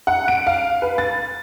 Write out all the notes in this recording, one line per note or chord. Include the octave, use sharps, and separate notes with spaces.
F#5
D7
F5
B4
A6